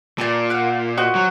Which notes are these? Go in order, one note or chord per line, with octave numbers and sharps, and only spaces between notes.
A#2 D5 G#5 A5
F5 F#5
F#4 C5 D#5
F#3